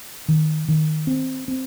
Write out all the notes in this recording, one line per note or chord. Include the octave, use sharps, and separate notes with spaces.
D#3
D#3
C4
C4